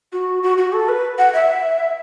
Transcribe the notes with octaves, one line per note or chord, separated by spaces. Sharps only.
F#4
F#4
F#4
A4
B4
F#5
E5